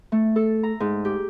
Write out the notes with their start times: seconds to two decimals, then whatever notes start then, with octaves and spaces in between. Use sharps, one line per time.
0.12 A3
0.36 A4
0.63 A#5
0.80 G#2
1.05 G4